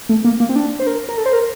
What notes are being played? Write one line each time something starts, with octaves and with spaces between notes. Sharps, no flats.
A3
A#3
A#3
C4
D4
C5
A#4
A#4
A4
C5
A#4